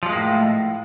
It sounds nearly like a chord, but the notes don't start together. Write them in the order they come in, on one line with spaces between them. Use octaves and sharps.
F3 G3 G#3 A#3 A2